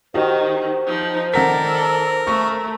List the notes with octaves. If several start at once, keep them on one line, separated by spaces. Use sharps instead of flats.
D#3 F#4 G4 C5 D#5
F3 D#4
D#3 A4 A#4 D5 F#5 B6
A3 C#6